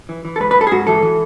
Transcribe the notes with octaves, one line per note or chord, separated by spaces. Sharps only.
E3
E3
A4
G#2 B4
B4
G#2 A4
G#4
G#2 F#4
E3 A4
E3